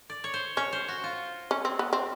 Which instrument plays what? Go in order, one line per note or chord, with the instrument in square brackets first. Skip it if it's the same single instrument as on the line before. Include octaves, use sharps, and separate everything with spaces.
[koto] D5
C#5
C5
[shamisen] C#4 [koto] C#5
[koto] C5
F#4
F4
[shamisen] C#4
C4
B3
C4